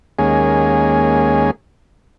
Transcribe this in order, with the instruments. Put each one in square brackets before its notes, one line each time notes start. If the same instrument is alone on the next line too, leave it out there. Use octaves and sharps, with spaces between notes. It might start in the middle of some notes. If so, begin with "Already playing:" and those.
[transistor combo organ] D#2 G#3 A#3 C#4 G#4